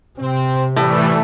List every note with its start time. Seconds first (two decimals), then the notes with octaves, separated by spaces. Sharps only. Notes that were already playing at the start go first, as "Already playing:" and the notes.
0.19 C3 C4
0.76 A2 E3 G3 A3